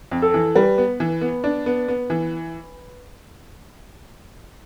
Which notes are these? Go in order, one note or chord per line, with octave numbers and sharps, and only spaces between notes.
F2
A4
E3
G3 B4
B3
E3
B3
D4
B3
B3
E3